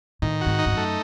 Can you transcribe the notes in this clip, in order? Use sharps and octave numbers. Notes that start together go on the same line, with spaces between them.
A2 D#3
G#2 F#4
D#4
G#2
F#2 A3